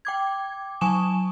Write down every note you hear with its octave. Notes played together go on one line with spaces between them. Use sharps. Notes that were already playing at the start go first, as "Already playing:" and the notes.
G5 D6 G#6
F#3 G#5 A5 C#6 D#6 E7